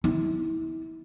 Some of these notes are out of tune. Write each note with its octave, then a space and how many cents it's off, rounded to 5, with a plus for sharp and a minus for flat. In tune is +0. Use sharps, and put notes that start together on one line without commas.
E4 -35